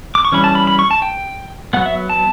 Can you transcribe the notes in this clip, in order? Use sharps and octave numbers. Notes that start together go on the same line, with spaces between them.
D6
C#6
E3 G3 C#4 B5
A5
B5
B5
C#6
A5
G5
F#3 B3 F#5
E5
A5